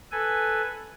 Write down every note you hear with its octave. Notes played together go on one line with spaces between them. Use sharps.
A4 B4 G#5